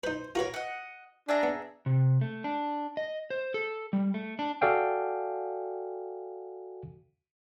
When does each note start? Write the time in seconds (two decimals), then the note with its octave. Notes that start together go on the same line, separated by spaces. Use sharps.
0.03 D#4 B4 C5
0.35 F4 F#4 A#4 B4 C#5
0.54 D#5 F#5
1.29 D4 G#4 E5 A#5
1.43 B3
1.86 C3
2.21 A3
2.44 D4
2.97 D#5
3.30 C5
3.54 A4
3.93 G3
4.14 A3
4.39 D4
4.61 F#4 A4 D5 F5 G5 G#5